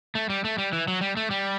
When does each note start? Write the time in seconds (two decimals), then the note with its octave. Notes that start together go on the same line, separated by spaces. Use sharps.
0.15 A3
0.30 G3
0.45 A3
0.58 G3
0.73 E3
0.88 F#3
1.01 G3
1.17 A3
1.31 G3